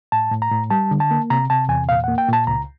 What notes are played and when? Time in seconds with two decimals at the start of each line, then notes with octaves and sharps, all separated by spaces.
0.12 A2 A5
0.32 A2
0.42 A#5
0.51 A2
0.70 G3 A5
0.91 D3
1.00 A5
1.11 A#3
1.30 C3 A#5
1.50 C3 A5
1.69 E2 G#5
1.89 A#2 F5
2.04 A#3 F#5
2.18 G5
2.29 A#2 A5
2.47 C#2 A#5